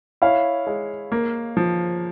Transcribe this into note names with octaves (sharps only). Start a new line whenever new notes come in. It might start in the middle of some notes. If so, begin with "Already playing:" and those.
E4 C#5 F5
G#3
A#3
F3